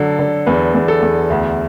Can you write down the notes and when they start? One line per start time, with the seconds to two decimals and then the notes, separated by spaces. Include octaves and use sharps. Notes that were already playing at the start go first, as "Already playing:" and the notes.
Already playing: D3 F#3 A4
0.19 D3
0.46 E2 B4
0.74 E2
0.88 A4
1.02 E2
1.30 D2